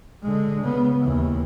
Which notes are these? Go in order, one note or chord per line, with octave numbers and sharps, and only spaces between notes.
D3 G#3
C#3 B3
D#2 E3